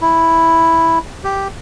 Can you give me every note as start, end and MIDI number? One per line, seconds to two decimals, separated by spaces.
0.01 0.99 64
1.24 1.48 67